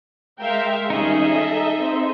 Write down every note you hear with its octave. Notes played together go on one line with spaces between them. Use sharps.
G#3 A#4 E5 F5 G5
D#3 G3 C#4 D#4 G#4 D#5 E5
A4
C4